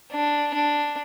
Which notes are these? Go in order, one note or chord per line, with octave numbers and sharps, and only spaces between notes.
D4
D4